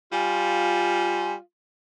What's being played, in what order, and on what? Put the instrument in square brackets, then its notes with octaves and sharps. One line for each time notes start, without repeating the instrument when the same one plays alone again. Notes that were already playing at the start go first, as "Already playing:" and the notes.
[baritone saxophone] G3 [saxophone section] F4 [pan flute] G#5